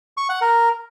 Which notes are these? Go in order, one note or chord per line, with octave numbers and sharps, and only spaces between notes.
C#6
F#5
A#4